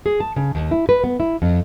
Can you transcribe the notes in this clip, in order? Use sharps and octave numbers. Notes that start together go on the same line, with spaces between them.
G#4
A5
C#3
D#2
E4
B4
B3
E4
F2